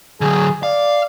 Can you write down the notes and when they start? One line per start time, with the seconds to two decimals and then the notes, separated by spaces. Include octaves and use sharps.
0.21 D3 F#3 G#4
0.63 D5 F5